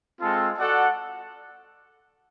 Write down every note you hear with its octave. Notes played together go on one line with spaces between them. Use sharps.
G#3 C4 F4 A4
F#4 A4 D5 F#5